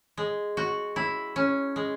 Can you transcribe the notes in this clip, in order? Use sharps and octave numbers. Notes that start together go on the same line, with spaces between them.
G#3
F#4
E4
C#4
G#3